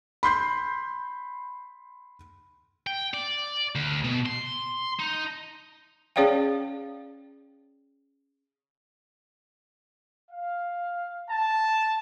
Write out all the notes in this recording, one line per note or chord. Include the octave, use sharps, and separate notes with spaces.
B5 C6 G6 C7
G5
D5
D2
B2
C6
D#4
C#4 G#4 C#5 D5 F5 G5
F5
A5